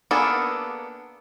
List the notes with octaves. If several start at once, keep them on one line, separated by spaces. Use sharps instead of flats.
A#3 B3 D4 G#4 A4